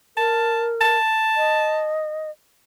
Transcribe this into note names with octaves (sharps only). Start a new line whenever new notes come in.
A#4 A5
A5
D#5